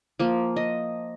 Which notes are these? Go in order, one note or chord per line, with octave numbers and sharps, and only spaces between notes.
F3 A#3
D#5